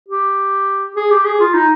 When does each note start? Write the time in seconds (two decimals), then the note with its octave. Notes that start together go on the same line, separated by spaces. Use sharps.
0.08 G4
0.96 G#4
1.10 G4
1.25 G#4
1.40 F4
1.54 D#4